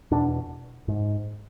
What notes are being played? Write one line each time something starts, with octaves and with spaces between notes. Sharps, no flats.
E2 B2 D4
G#2